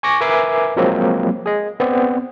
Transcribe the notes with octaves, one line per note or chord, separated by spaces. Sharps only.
G#5 C#6 D6 A#6
A#4 B4 E5 G#5 D6 C7
F3 F#3 G#3 A#3 C4
G#4 D#5
B3 C4 D5